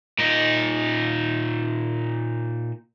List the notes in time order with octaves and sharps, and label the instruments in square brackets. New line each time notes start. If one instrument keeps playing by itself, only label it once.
[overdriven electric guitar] A#2 D#4